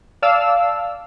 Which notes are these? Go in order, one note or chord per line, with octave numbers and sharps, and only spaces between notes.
D5 F5 A5 E6